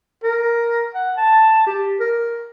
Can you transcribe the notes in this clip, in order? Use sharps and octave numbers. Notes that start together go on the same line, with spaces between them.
A#4
F#5
A5
G4
A#4